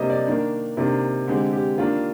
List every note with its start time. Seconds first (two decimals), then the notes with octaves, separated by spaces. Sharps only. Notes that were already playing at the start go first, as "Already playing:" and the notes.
Already playing: C3 G3 A#3 D4 C5 D#5
0.10 D5
0.27 D#3 A#3 D4
0.77 C3 D#3 A#3 D4
1.28 D3 G#3 C4 G4
1.53 G4
1.78 D#3 A#3 D4 F4